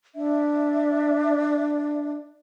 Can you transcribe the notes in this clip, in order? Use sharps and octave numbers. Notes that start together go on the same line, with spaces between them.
D4 E5